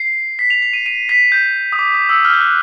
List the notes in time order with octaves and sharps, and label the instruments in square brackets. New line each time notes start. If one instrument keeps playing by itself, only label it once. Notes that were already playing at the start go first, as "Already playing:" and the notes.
Already playing: [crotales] C7
B6
F7
F7
D#7
D#7
B6
G6
D#6
D6
D#6
E6
F6
G6
F#6